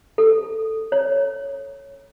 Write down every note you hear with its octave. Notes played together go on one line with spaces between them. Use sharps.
A4
C#5